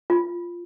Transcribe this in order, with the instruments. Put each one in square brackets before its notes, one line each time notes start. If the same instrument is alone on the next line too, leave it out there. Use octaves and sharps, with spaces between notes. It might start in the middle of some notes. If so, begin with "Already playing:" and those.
[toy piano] F4